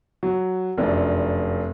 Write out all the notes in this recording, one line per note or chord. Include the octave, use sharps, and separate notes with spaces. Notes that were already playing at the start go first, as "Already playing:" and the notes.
F#3
F1 F#2 D4